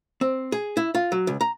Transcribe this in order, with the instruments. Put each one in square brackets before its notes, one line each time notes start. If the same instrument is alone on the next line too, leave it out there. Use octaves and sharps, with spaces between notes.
[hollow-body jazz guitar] C4
G#4
E4
F4
F#3
C#2
A#5